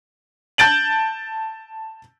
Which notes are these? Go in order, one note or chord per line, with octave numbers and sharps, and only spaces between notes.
A5 G6 A6 D7 F#7